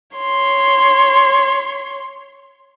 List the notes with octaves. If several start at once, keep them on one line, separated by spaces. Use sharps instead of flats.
C#5 C6